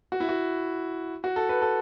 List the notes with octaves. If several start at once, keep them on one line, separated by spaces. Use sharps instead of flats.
F#4
E4
F#4
F#4
A4
B4
A4